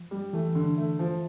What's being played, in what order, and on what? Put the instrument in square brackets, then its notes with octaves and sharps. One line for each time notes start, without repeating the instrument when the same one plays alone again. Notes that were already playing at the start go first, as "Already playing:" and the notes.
Already playing: [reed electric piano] F3
[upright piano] G3
[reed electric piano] E3 [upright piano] A3
[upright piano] D3
A3
F3